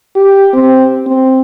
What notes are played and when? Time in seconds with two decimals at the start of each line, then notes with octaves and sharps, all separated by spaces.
0.15 G4
0.54 C4
1.06 C4